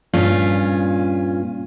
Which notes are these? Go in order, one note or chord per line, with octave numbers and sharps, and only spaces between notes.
G2 A#2 C#4 F4